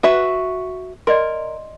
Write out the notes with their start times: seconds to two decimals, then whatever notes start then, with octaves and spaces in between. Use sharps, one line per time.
0.03 F#4 B4 E5
1.07 A#4 D5 D#5 C6